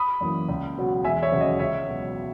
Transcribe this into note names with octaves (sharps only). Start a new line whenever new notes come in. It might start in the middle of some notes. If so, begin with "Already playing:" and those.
Already playing: B5 D#6
F#2 E3 A#3
C#2
B2 F#3 B3
E1 E5 G#5
C#5 E5
D#2 C#3 F#3
D#5
C#2 C#5 E5
B2 F#3 B3